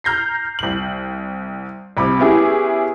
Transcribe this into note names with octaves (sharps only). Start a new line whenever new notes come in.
A#5 F6 G6 A#6 C7
C2 F#7
C2 C3 B5
B3 C#4 E4 G4 G#4